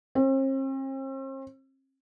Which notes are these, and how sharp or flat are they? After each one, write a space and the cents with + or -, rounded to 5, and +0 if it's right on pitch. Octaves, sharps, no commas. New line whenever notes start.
C4 +45